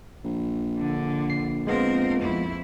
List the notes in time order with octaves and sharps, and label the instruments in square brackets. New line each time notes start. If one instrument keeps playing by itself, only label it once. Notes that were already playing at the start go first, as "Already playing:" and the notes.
[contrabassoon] A#1
[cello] D3
[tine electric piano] C7
[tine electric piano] G#3 B3 F4 [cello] C4 A#4
[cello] F2 E4